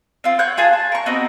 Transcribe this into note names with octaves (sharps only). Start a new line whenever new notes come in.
C4 F4
C#5 F#5 F#6 G6
F4 G#4 G#5 A5
A5
A#4 C#6
B3 C4 D#4 F#4